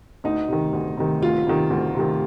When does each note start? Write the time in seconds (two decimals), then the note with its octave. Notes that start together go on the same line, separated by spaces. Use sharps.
0.24 D2 D#4
0.48 C3 D#3
0.73 D2
0.97 C3 D#3
1.22 D2 F4
1.47 C3 D#3
1.70 D2
1.95 C3 D#3